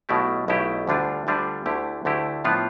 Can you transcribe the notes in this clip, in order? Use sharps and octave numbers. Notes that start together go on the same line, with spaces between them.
B1 B2 A3 E4 G4
B1 B2 A3 E4 G4
D2 D3 G3 D4 F4
D2 D3 G3 D4 F4
D2 D3 A3 E4 G4
D2 D3 A3 E4 G4
A2 F3 B3 D4 F4